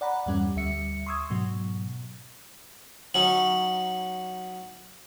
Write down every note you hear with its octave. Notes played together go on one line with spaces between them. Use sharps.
D5 F#5 A#5 B5
E2 G2 G3 C#4 F#5
D2 G3 E5 C#7
C6 C#6 D#6 E6 G#6
G#2 B2 F#3
F#3 C#4 D#4 F#7